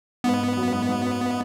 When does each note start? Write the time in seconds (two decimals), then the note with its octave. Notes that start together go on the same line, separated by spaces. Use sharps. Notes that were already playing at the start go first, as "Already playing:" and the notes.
0.24 G#2 B3
0.40 G#2
0.57 F#2
0.72 G#2
0.89 G#2